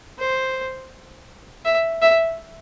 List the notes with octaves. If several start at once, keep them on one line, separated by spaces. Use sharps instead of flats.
C5
E5
E5